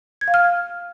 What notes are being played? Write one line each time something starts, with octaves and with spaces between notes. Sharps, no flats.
G#6
F5
F6